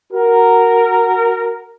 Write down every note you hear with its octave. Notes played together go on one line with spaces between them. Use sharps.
F#4 A#4